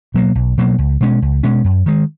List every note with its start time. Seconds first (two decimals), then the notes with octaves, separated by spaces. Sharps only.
0.14 B2 F#3 A#3
0.35 B1
0.58 B2 F#3 A#3
0.78 C#2
1.01 B2 G#3 C#4
1.22 C#2
1.43 B2 G#3 C#4
1.64 F#2
1.86 D#3 G#3